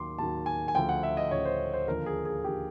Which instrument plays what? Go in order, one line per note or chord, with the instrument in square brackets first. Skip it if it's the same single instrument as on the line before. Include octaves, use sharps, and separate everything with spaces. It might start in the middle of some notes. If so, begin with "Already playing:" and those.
Already playing: [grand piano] D#2 D#3 F#3 C6 D6
D#2 D#3 F#3 A5
G#5
G#5
D2 C#3 F3 G5
F#5
E5
D#5
D2 C#3 F3 C#5
C5
C5
D#2 D3 F3 A#4
G#4
G#4
D3 F3 G4